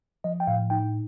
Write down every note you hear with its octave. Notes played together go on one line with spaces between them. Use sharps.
F3 D#5
G5
A2 F5
D#4 G5